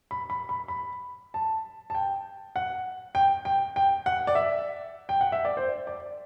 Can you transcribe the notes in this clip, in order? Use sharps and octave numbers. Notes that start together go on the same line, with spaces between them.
B5
B5
B5
B5
A5
A5
G5
F#5
G5
G5
G5
F#5
D5
E5
G5
F#5
E5
D5
C5
D5